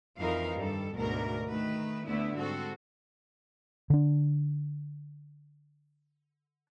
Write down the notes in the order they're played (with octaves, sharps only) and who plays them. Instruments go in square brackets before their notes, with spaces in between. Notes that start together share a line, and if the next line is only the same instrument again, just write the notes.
[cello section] F2 E3 D#4 A#4 F5
G2 D#3 G3 A4
D2 G#2 B2 A#4
D#3 A3 B4
D2 D3 A3 B3 E4 E5
G#2 G3 C4 F#4 A4
[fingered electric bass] D3 D4